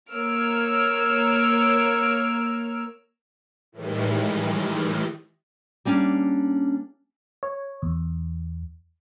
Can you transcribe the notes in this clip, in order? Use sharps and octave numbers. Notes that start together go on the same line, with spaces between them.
A#3 C#5 E6 F6 D7
A2 D#3 E3 G3 G#3
G3 A#3 C#4 D4
C#5
E2